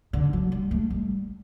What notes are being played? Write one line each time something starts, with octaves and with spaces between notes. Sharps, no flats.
D3
F#3
G3
A3
G3